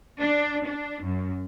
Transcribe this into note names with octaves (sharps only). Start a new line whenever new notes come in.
D4
D4
F#2